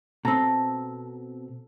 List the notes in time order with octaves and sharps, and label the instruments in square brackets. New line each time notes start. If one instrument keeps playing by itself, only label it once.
[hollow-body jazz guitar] B2 C4 [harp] A4 A5 A#5